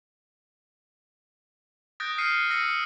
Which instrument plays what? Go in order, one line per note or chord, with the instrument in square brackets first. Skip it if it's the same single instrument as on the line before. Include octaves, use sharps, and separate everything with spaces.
[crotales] D#6 F#6 G6 A6 A#6 D7
D#6 F6 G6 C7 C#7 D#7
E6 A#6 C#7 D#7